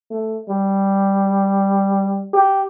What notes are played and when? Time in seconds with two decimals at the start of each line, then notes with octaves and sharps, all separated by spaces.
0.10 A3
0.49 G3
2.33 G4